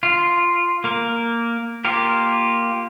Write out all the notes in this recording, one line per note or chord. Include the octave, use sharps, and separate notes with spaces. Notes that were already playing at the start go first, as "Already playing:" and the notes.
F4
A#3 A#4
A#3 F4 G4 A#4